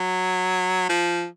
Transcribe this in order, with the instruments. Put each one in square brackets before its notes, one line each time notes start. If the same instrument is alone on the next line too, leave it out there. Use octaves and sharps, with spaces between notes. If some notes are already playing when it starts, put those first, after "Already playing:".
Already playing: [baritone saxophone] F#3
F3